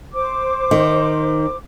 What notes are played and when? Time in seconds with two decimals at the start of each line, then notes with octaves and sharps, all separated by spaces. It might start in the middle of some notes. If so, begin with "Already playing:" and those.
0.13 C5 D6
0.71 D#3